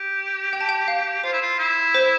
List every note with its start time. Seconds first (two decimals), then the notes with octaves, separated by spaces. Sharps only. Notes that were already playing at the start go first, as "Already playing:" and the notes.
Already playing: G4
0.53 G5
0.61 A5
0.69 G5
0.88 F5
1.24 F4 C5
1.33 E4
1.42 F4
1.58 E4
1.94 C5